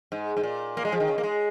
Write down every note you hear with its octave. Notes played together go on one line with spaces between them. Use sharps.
G#2
G#2
A#2
A#3
G#3
F3
D#3
C#3
A#3
G#3